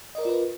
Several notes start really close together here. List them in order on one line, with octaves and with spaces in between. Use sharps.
D#5 A#4 D5 F4 B4